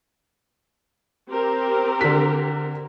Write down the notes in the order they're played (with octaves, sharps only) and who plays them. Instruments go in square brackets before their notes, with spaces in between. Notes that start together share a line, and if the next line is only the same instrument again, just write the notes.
[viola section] C4 G4 A#4
[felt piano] D3 B6